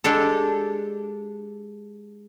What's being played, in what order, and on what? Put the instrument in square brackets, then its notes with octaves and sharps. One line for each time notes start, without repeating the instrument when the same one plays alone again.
[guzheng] G#3 D4 G4 A4